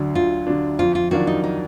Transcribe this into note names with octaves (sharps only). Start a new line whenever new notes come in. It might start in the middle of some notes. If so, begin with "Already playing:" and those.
Already playing: D2 D3 F#3 D4
D2 F4
D3 F#3 D4
F2 F4
F4
D#3 F#3 D4 F4 F#4
D#4
D#4